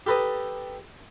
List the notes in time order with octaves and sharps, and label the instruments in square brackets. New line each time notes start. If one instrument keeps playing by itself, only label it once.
[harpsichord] G4 A4 B4 A#5 D#6